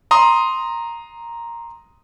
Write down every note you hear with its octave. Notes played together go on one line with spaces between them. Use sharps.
A#5 C6 D#6